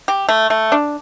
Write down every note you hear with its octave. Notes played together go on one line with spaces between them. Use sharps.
G4
A3
A3
D4